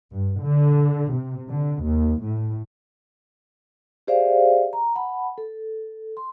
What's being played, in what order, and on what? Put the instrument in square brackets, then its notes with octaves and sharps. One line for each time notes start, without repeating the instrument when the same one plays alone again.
[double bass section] G2
D3
C3
D3
D#2
A2
[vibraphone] G4 G#4 C5 D5 E5 F5
A#5
F#5 A5 B5
A4
C6